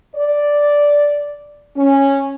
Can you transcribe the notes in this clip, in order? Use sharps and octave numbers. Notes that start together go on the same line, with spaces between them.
D5
C#4